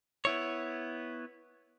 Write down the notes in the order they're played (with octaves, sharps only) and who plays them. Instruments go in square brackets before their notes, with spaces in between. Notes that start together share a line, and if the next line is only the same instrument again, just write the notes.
[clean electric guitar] B3 E4 C#5